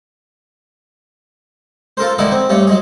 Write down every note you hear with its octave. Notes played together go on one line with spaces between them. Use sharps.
F4 A4 A#4 C5
D3 D#3 G#3 E4 F#4
C4
G2 A3 C#5
F#3 G#3 G#4